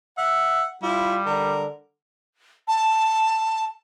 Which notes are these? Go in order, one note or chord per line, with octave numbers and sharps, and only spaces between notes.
E5 F#5
G3 E4 F4
D3 A#4
A5